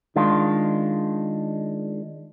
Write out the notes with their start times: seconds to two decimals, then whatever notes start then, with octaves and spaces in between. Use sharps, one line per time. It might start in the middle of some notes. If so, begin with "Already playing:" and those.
0.16 D#3 G#3 D4 F4